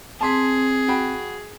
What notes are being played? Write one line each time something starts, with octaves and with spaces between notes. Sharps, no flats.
C4 G#4 A5 C6 B6
F#4 G5 B5